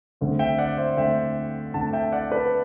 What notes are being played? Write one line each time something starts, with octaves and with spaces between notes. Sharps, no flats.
D2 D3 A3 C4
E5 G5
D5 F#5
C5 E5
D2 D3 A3 C4 E5 G5
D2 D3 A3 C4 F#5 A5
E5 G5
D5 F#5
B4 D5